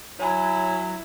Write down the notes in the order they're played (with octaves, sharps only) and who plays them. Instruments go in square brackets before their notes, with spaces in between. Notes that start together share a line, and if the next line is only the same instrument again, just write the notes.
[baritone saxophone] F#3 [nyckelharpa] E4 [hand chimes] C#5 G#5 B5